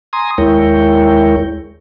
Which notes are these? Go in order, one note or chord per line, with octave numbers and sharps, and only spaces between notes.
G#5 A#5 C6 D#6
D#2 G#3 E4 A#4 C#5 G5